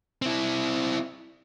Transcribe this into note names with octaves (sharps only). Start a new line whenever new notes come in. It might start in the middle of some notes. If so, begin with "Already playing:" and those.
C4 E4